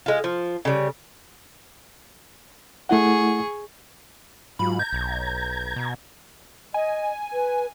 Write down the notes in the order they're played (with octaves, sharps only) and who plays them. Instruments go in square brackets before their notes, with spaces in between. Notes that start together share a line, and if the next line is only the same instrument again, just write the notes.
[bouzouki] G#3 F4
F3
C#3 G3
[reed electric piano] A3 E4 F#5 [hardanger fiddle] G#4 C#6
[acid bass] G#2 [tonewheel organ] F#3 F4 [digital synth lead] B5
[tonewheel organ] A#5 G#6 [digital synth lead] G6
[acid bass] B1
B2
[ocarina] D#5 [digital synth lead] G#5
[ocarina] B4